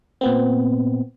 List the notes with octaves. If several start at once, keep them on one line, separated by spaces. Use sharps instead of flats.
A#2 B3 C4